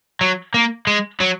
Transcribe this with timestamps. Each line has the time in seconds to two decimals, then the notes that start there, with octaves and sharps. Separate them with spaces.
0.21 F#3
0.54 A#3
0.87 G#3
1.20 F#3